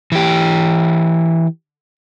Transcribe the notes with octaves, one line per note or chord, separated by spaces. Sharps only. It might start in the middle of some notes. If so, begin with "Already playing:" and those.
E3 G4